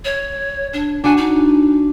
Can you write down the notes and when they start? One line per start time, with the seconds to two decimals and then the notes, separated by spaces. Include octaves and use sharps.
0.04 C#5
0.73 D4
1.04 D4 F#4 G#5
1.17 D#4